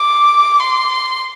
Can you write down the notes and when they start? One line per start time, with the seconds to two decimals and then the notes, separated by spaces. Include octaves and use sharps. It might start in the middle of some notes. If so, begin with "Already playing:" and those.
Already playing: D6
0.60 C6